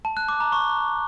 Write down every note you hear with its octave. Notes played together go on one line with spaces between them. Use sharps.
A5
F#6
D6
A#5
C#6